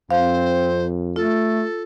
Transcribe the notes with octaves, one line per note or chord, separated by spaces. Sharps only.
F2 C4 C5 F5
A3 F4 A4